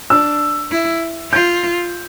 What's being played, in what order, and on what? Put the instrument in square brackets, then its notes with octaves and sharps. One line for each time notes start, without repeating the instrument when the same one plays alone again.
[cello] D4 [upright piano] E6
[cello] E4
[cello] F4 [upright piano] G6